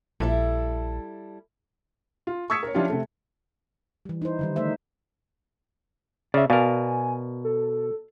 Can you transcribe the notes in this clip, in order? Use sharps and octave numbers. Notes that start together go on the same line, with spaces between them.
A#1 G3 E4 A4
F4
C#6 D#6 E6 G#6 B6 C#7
A#4 C#5
F3 C#4 D4 E4 F4 G4
C3 A3
E3 G3
D#4 E4 C5
D3 D#3 G3
D3 A3 D#4 C5 E5
C#3 D5 E5
B2 A#4 D5 F5 G#5
A4